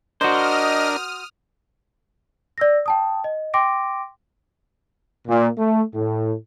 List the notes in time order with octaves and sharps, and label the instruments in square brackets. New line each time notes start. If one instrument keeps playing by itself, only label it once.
[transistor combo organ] D4 A#4 [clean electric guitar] F#4 C5 [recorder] D#5 [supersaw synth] D#6 F6
[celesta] D5 E6 A#6
G5 A5 D#6
D#5
G5 C6 D6 A#6 D7
[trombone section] A#2
A3
A2